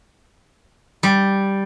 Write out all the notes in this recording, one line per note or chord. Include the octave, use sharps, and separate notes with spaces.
G3